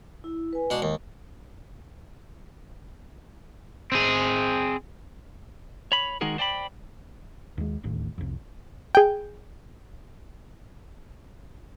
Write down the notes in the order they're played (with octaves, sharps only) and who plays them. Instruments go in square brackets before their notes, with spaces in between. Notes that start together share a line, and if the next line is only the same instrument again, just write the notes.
[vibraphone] E4
B4 G#5
[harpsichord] B2 D4 [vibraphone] G#3
[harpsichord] D#2
[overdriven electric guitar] C4 G#4
[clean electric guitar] C#5 B5
D#3 G#3 D#4 F#4 G#4 A#4
C5 D5 G5 G#5 B5
[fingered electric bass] D#2 G#3
D1 A1 D#2 A2
C2 F2
[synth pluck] G#4 G5